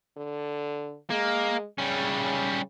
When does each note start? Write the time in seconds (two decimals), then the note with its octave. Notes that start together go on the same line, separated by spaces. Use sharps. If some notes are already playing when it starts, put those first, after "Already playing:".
0.17 D3
1.10 G#3 A#3
1.78 C#3 G3 C#4